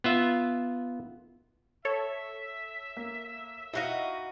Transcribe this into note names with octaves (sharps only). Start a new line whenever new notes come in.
B3 F4 E5
A4 C#5 E5
A#3
D#4 E4 F#4 D#5 F5